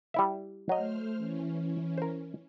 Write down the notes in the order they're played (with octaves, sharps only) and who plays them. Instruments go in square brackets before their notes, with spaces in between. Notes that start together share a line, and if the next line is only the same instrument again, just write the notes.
[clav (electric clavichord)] G3 E4 E5
[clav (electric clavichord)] F#3 D#5 [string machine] A3 C5 F6
[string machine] E3 C#4
[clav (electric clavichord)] A#4 C5